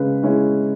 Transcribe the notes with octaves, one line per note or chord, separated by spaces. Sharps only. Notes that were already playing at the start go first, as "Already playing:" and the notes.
Already playing: C#3 G#3 B4
G#3 C#4 E4